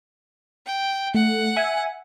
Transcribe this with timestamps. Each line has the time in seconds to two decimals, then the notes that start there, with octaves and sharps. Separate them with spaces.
0.66 G5
1.14 A3 F#5
1.56 E5 G#5